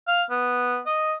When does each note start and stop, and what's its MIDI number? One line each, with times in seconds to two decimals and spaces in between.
0.07 0.23 77
0.30 0.79 59
0.86 1.14 75